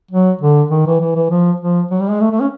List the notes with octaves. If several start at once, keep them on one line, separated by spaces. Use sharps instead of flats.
F#3
D3
D#3
E3
E3
E3
F3
F3
F#3
G3
G#3
A3
A3
C#4